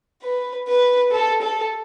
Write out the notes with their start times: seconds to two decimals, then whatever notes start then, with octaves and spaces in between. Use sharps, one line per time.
0.23 B4
0.68 B4
1.12 A4
1.42 A4